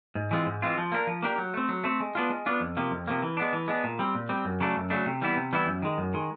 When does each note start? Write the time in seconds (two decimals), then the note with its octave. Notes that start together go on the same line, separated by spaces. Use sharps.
0.15 G#2
0.31 E3 G#3 C4 F4
0.46 G#2
0.62 E3 G#3 C4 F4
0.78 F3
0.92 A#3 D4 G4 A#4
1.07 F3
1.22 A#3 D4 G4 A#4
1.38 F#3
1.54 A3 C4
1.69 F#3
1.84 A3 C4
2.00 G#3
2.15 B3 D4 F4
2.30 G#3
2.46 B3 D4 F4
2.60 F2
2.77 C3 F3 A#3
2.91 F2
3.08 C3 F3 A#3
3.22 E3
3.37 G#3 B3 D4
3.53 E3
3.68 G#3 B3 D4
3.84 A#2
3.99 G3 C4
4.15 A#2
4.29 G3 C4
4.45 F#2
4.60 C#3 F#3 A3 D4
4.76 F#2
4.90 C#3 F#3 A3 D4
5.06 C3
5.21 E3 G3 B3 E4
5.36 C3
5.53 E3 G3 B3 E4
5.67 F#2
5.82 D#3 G#3
5.98 F#2
6.14 D#3 G#3